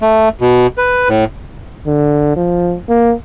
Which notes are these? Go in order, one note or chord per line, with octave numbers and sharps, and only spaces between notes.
A3
B2
B4
A2
D3
F3
A#3